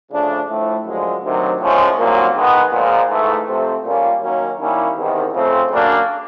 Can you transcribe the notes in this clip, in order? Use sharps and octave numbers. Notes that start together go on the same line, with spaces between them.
C#3 F3 A3 D4
A2 F3 A3
F#2 D3 F3 G#3
D2 C3 D#3 F#3
A2 F3 G#3 C#4
C2 A#2 F#3 A#3
D#3 G#3 B3
A#2 F3 G#3
G#2 E3 A3
C3 F3 A3 C4
A#2 G3 A#3 C#4 F4
F#2 D#3 F#3 A#3 C#4
D#3 G3 A#3 C#4 E4
E2 C3 D#3
C#3 F3 A3 C4
C#3 F#3 A#3 D4